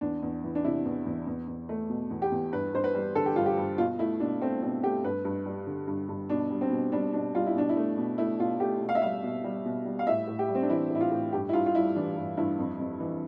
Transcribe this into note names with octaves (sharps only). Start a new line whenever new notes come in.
E2 D4
E2
E3
D4
C3 E4
E2
E2
E2
E2
A3
B2
E2
G4
E2
G2 B4
G2 C5
B4
G3
D3 A4
G4
G2 F4
G4
G2
B2 F4
A3 E4
B2 D4
A3 C4
B2 C4
A3 G4
G2 B4
G2
G3
D3
G2
G2
B2 D4
G3
C4
B2
G3 D4
B2 D4
G3 F4
E4
B2 D4
E4
A3
B2
A3 E4
B2 F4
A3 G4
B2
F5
E5
G3 F5
B2
G3
B2
G3
F5
A2 E5
A2
G4
G3
C4
D4
E3 E4
A2 E4
F4
A2
G2 G4
E4
G2 F4
F4
G3 E4
E3 D4
G2
G2 E4
F2
F2
E3